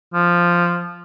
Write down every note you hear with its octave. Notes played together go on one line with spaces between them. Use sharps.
F3